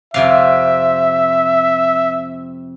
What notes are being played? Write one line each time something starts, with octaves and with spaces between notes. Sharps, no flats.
F2 C3 E5 F5